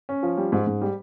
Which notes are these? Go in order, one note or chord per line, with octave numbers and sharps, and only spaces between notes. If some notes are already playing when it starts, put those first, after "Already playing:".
C#4
F3
G3
G#2
G#2
G3